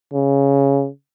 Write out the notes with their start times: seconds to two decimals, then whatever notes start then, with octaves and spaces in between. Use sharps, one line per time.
0.14 C#3